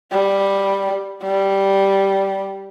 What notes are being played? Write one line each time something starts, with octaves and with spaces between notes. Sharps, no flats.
G3
G3